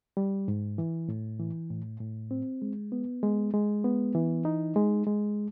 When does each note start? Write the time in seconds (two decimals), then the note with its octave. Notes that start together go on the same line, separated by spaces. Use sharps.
0.17 G3
0.48 G#2
0.78 E3
1.09 A2
1.40 E3
1.70 A2
2.00 A2
2.31 C4
2.62 G#3
2.92 B3
3.23 G#3
3.54 G#3
3.84 B3
4.15 E3
4.45 D#4
4.76 G#3
5.07 G#3